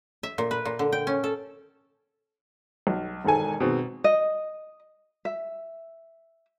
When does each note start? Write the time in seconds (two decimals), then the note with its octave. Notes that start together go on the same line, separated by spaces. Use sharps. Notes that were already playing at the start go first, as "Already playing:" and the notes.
0.23 E5
0.38 A#2
0.51 B4
0.65 A#2
0.79 D3
0.92 G5
1.07 C#4
1.24 A4
2.87 B1
3.24 E1 G#2 D#3 A4 G#5
3.60 B2 D#3 G#3 C4
4.04 D#5
5.25 E5